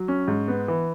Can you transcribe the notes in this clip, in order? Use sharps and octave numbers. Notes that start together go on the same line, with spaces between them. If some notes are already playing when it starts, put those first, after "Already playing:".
Already playing: F#3
C#4
G#2
B3
E3